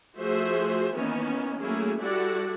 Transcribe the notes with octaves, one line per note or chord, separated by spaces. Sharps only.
F3 A3 F#4 G#4 C5 E5
D#3 E3 A#3 B3 C#4
F#3 A3 A#3 C#4 E4 G#4
G3 E4 F#4 A4 D5 F#5